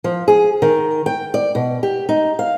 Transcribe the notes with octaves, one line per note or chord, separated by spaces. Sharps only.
F3
G#4
D#3
G5
D5
B2
G4
D#4
F5